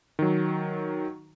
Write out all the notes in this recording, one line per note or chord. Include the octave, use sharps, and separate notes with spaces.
D#3 F#3